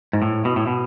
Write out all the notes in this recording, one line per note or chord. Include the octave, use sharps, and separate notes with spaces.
G#2
A2
B2
A2
B2